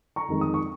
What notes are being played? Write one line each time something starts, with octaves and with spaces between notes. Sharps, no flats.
A#5 C#6
F2 D#3 G#3
D#6
C#6